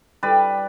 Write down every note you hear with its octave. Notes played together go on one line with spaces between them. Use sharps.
G3 B4 D5